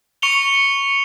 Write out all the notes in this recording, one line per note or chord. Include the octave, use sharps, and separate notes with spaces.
C#6 C#7 F7 G7